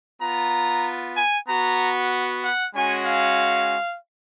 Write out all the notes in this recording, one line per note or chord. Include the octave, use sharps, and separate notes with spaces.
B3 F4 A#5
G#5
B3 F#4 A#5
F#5
G#3 C#4 F#4 G#5
F5